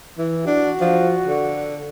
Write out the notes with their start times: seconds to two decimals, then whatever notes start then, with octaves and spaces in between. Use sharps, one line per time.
0.18 E3
0.47 D4 F#4
0.81 F3
1.26 D3